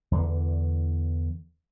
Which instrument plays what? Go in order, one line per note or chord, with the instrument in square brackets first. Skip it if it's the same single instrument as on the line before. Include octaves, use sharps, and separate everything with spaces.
[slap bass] E2 D3 E3